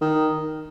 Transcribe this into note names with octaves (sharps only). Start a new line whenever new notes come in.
D#3